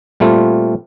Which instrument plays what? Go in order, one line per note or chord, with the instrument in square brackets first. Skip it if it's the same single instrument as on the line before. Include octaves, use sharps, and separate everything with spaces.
[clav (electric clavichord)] A#2 G3 A3 C4 F4